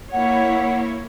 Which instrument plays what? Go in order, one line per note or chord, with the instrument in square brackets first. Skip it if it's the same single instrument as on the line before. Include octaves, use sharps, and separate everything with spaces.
[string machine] A#3 [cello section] E4 C#5 [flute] F#5